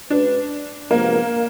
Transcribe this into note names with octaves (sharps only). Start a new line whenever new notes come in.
G#3 C#4 D4 F#4 B4
C3 F3 G#3 A#3 B3